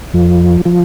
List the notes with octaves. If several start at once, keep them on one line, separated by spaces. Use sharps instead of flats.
F2 F3
F3